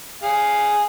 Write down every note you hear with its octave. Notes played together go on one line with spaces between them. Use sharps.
G#4 F5